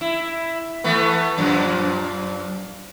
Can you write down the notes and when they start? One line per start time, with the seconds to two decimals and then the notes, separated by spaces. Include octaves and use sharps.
0.01 E4
0.84 E3 A3 B3
1.38 F#2 A#2 F3